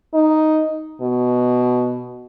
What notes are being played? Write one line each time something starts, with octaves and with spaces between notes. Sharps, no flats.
D#4
B2